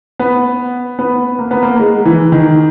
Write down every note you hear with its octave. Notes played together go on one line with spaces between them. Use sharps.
B3
B3
A#3
B3
A#3
G#3
E3
D#3